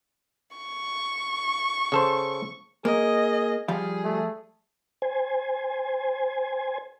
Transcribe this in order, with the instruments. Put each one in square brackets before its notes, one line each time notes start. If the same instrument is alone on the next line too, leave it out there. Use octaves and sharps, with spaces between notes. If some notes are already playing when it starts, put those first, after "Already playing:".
[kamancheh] C#6
[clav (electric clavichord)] C#3 A4 C5
[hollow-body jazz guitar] A#3 [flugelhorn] G#4 [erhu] D#5
[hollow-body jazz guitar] F3 G3 F5 [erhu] G#4
[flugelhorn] A3
[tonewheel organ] C5 G#5